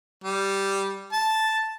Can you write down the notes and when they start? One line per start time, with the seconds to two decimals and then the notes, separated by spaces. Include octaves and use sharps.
0.24 G3
1.12 A5